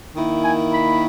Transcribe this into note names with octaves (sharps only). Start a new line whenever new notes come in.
D#3 A#3 E4
G#5
B5